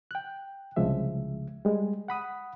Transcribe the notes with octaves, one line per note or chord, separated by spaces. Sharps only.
G5 F#6
C2 C#3 F3 G#3 E5
G3 G#3
F#5 B5 D#6